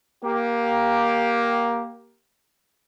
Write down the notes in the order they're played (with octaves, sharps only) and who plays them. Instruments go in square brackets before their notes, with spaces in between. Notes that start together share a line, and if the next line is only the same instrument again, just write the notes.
[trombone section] A#3 G4